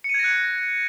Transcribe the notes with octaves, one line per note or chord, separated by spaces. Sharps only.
F#6 G#6 A#6 C#7 D#7